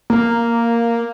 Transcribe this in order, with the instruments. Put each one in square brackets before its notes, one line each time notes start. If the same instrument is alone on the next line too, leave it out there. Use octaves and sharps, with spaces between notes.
[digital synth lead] A#3